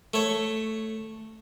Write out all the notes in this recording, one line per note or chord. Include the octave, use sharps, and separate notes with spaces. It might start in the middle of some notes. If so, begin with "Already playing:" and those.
A3 C#5